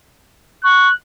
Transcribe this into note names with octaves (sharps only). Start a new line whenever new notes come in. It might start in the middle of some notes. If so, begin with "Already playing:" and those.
C#6 F#6